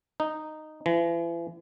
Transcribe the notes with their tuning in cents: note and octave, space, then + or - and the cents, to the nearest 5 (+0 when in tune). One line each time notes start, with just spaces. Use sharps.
D#4 -10
E3 +40